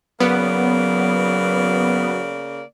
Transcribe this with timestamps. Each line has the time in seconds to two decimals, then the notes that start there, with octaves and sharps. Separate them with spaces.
0.20 C#3 F#3 A#3 B3 D5